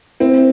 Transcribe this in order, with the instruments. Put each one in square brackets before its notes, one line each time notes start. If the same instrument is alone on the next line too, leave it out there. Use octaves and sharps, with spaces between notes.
[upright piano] C4 [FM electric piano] E4